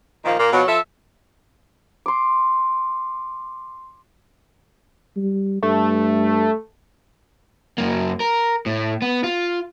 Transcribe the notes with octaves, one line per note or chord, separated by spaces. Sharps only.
A#2 D#3 F3 A#3
A#2 A#3
B2 F3 F#3
F3 A4 E5
C6 D6
G3
G2 A3
F#2 A#3
A#4
A2
B3
F4